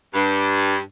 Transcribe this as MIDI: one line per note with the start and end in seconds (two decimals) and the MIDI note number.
0.14 0.79 43